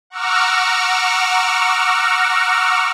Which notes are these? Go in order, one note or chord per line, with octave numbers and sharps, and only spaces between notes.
F#5 A#5 C#6 D6 E6 F6